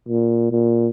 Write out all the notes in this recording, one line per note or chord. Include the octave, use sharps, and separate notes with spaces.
A#2
A#2